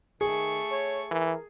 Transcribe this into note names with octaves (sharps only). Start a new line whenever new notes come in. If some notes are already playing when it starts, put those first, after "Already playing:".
D#3 A3 G#4 C#6
C#5
E3 A#4